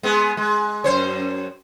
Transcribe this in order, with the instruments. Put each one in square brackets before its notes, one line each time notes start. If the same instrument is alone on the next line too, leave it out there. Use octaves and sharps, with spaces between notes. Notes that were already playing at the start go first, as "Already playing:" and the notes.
[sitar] G#3 B3 G#4
G#3
F#2 C5 C#5